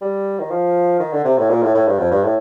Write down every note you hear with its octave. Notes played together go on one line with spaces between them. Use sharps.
G3
D#3
F3
D#3
D3
C3
A2
A#2
A2
A2
G2
F2
G2
A2